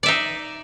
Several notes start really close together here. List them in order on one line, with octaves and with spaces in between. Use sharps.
D5 E5 D#4